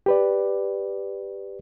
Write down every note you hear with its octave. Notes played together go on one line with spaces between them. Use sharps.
G4 B4 D5